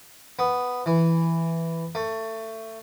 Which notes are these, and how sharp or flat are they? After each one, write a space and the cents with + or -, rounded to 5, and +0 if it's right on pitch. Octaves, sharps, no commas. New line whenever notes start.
B3 +5
E3 +5
A3 +20